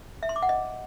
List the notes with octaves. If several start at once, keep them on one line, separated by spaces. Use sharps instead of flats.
E5
C6
D6
F#5
D#5